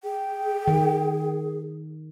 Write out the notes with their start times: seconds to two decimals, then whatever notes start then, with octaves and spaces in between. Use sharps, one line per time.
0.04 G#4 G5
0.68 D#3